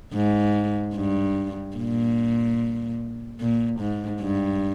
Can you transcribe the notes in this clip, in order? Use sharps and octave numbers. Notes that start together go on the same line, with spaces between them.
G#2
G2
A#2
A#2
G#2
G2